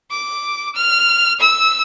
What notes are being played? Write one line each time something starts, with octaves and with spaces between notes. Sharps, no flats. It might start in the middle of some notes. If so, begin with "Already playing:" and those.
D6
F6
E6